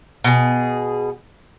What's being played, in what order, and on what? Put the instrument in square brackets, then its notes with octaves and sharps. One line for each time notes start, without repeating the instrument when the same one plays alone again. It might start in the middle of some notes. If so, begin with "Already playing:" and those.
[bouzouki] B2 G#4